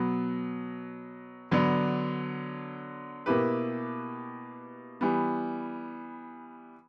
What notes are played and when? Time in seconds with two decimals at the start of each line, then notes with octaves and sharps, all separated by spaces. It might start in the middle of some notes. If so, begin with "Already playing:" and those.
Already playing: B2 F#3 B3
1.51 D3 F#3 B3 D4
3.26 B2 A#3 E4 G4 B4
5.01 E3 G3 B3